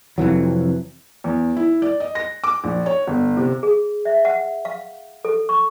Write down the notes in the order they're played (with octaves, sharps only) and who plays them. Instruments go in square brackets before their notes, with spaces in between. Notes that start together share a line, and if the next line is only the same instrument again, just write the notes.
[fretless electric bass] F2 C3 E3 F#3
[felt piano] E2
E4
D5
D#5
A#6
D6
A#1
C#5
G1
C3
[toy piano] G#4
E5
F#5
F5
A4
C#6